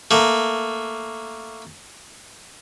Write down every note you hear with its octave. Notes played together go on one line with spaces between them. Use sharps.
A3 A#3